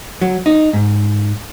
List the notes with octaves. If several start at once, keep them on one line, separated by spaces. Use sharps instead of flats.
F#3
D#4
G#2